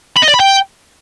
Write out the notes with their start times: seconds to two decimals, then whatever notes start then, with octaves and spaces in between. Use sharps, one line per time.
0.17 B5
0.23 D#5
0.28 D5
0.34 B5
0.40 G5